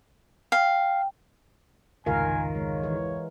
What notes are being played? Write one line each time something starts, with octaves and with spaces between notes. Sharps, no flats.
F5 G5
F1 C#2 G#2 D#3 F4 A#4 F5 G#5
G#3 C#5
E3